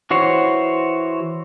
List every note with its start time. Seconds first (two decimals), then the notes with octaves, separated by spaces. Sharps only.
0.10 E3 F#4 C5 C#5